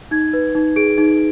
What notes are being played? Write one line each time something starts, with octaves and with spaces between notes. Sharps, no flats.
D#4 G#6
B4
D#4
G#4 D7
D#4